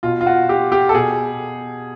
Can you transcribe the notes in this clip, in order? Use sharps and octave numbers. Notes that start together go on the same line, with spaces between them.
B2 F4
F4
F#4
G4
G4
A4
B2 G#4